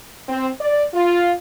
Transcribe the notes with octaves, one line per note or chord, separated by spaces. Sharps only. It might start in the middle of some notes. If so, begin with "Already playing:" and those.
C4
D5
F4